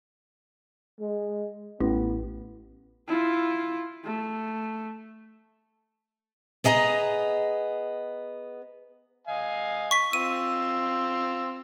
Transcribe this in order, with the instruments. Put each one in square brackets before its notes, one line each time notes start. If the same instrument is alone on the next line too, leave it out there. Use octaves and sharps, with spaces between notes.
[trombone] G#3
[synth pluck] A1 [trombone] B3
[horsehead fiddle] E4 F4
A3
[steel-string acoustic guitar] B3 G#4 D#5 G#5 A#5
[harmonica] D#5 F5 G#5
[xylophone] C#6 B6
[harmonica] C4 F4 E6 [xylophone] D#7